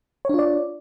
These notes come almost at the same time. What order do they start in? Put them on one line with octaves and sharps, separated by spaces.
C#5 D4 F4 D5